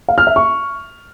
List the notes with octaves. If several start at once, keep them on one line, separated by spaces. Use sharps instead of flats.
F5
F6
E5
C#6